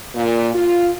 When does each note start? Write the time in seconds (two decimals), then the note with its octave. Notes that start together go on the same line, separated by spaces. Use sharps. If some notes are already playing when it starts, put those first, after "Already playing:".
0.15 A#2
0.54 F4